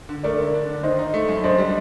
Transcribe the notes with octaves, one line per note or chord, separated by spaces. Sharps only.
D3
A3 A#4 D5
D3
D4
D3
D#3 C5 D#5
D#4
A3
F#2
D4 C5 D#5
G3